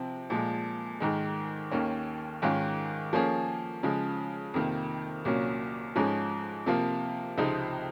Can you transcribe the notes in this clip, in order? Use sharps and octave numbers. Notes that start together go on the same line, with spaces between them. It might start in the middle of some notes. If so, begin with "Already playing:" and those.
Already playing: C3 F3 C4
A#2 F3 G#3
G#2 D#3 G#3
D#2 D#3 A#3 C#4
G#2 D#3 G#3 C#4 F4
F3 A#3 C#4 G#4
C#3 F3 G#3
F2 C3 D#3 A#3
C2 A#2 F#3 A#3 C#4
G#2 F3 G#3 C#4
C3 F3 A#3 F4
C#2 C3 F3 C4 D#4